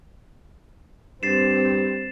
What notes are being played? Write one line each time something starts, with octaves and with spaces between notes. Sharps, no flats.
G2 C4 A6 C7 E7